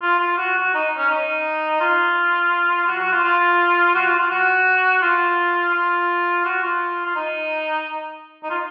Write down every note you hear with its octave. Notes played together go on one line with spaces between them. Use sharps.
F4
F4
F#4
F#4
D#4
C#4
D#4
F4
F#4
F#4
F4
F4
F#4
F4
F4
F#4
F4
F4
F#4
F4
F4
D#4
D#4
F4